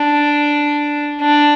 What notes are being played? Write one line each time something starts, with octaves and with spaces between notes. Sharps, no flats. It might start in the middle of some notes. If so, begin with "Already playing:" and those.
Already playing: D4
D4